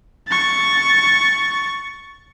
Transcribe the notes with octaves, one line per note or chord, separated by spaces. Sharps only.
C#6 A6